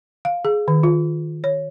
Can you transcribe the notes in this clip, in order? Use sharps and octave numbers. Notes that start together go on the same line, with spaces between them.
F5
G#4
D#3
F4
C#5